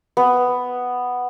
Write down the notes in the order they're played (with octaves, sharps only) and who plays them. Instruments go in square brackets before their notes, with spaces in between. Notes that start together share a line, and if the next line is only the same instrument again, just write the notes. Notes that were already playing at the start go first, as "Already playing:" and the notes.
[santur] B3